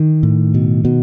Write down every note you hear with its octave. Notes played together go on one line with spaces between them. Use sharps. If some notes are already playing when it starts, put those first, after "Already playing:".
Already playing: D#3
A2
B2
B2